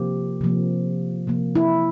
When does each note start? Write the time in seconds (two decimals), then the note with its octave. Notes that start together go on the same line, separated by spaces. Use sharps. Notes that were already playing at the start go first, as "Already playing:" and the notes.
Already playing: C3 F3 A#3 G4
0.41 C3 F3 A#3
1.27 C3 F3 A#3
1.56 E4